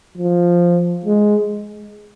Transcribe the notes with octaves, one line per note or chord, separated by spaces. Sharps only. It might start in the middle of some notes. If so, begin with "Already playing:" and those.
F3
G#3